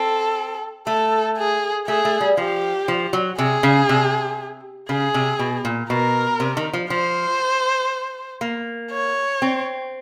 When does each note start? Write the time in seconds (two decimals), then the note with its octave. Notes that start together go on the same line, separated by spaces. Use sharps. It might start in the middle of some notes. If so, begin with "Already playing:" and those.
Already playing: C4 A4
0.87 A3 A4
1.37 G#4
1.88 A3 G#4
2.05 A3
2.21 G3
2.37 F3 G4
2.88 F3
3.13 F#3
3.38 C3 G#4
3.63 C#3
3.89 C3
4.89 C#3 G#4
5.14 C3
5.39 B2
5.65 A#2
5.90 B2 A#4
6.40 C3
6.57 D#3
6.73 F3
6.90 F3 C5
8.41 A#3
8.91 C#5
9.42 C4